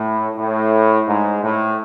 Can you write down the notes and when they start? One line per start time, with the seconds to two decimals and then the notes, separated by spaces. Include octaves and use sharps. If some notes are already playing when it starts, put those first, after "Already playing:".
Already playing: A2
0.37 A2
1.08 G#2
1.43 A2